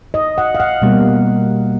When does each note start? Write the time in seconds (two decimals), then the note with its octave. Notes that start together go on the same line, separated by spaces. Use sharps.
0.14 D#5
0.38 F#5
0.55 F5
0.60 F#5
0.82 B2 G3 A#3